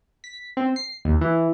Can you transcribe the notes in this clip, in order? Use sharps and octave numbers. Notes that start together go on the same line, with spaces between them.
B6
C4
C7
D#2
E3